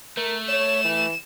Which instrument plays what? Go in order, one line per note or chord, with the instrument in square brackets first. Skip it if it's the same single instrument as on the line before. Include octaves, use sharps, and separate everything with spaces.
[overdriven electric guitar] A3 [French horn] A#4
[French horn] C#5 [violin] E7
[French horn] E3